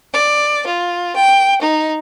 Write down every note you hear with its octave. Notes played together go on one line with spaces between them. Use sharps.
D5
F4
G5
D#4